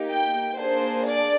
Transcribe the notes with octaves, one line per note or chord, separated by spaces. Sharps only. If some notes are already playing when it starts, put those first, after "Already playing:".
Already playing: A#3 D#4 G4
G5
A#3 D4 G#4 C5
D5